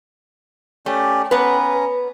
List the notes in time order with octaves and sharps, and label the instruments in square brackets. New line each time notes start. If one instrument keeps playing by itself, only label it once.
[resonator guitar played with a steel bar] A3 [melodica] C#4 G4 D5
[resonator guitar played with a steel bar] B3 B4 [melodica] C#4 A#5